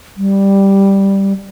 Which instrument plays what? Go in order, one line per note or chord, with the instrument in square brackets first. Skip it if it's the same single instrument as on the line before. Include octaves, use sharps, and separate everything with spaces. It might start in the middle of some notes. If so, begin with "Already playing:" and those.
[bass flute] G3